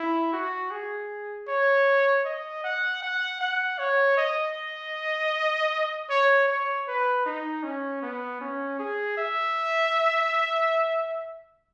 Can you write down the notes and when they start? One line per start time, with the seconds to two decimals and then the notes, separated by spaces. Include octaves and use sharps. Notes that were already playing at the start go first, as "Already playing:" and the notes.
Already playing: E4
0.33 F#4
0.71 G#4
1.48 C#5
2.25 D#5
2.64 F#5
3.02 F#5
3.41 F#5
3.79 C#5
4.17 D#5
6.10 C#5
6.48 C#5
6.87 B4
7.26 D#4
7.63 C#4
8.02 B3
8.41 C#4
8.79 G#4
9.17 E5